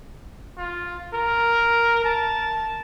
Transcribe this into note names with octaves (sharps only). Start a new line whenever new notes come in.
F4
A#4
A5